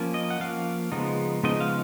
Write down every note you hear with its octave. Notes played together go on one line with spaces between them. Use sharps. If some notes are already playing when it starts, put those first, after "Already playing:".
Already playing: F3 A#3 C#4
D#5
F#5
F3 A#3 C#4 F5
C#3 F3 G#3 B3 D#4
C#3 F3 G#3 B3 D#4 D#5
F5